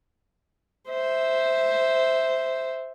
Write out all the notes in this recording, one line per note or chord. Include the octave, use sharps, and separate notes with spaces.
C5 E5